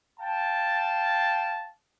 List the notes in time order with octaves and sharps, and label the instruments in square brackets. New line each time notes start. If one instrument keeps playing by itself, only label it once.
[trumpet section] F5 G5 A5